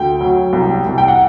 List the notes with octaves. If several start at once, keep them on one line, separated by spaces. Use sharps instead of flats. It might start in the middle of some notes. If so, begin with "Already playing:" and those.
Already playing: D2 G5
F#3
C2
C2
G5
F#5